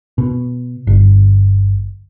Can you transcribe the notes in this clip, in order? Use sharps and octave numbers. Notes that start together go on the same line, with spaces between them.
B2
G1